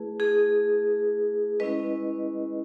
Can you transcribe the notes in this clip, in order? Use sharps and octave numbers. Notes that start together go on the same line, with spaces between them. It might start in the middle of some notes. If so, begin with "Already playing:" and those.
Already playing: A3 E4 G#4 B4
G#4
G#3 C#4 E4 B4 D#5